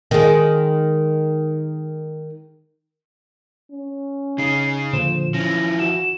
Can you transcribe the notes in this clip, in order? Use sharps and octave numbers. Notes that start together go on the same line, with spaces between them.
D#3 G#3
C#4
C#3 D#4 G#4 C7
A#2 D3 F3 C5 E7
E3 F3 C#4 E4 A#6
F#4 E7